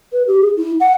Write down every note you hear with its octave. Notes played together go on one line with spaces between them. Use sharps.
B4
G4
G#4
E4
F#5